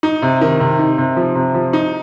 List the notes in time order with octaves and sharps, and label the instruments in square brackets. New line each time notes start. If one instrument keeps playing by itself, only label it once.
[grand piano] D#4
C3
D#3
C3
D#4
C3
F3
C3
F3
D#4